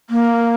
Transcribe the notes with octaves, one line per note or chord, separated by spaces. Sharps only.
A#3